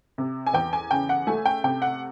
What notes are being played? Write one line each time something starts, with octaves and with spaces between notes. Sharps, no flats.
C3
G#5
E2 G5
G#5
C#3 G5
F#5
A3 G#5
G5
C3 G5
F#5